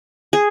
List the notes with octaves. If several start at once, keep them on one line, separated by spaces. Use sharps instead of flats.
G#4